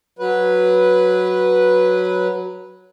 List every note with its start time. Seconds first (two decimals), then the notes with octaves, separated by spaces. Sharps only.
0.19 F#3 B4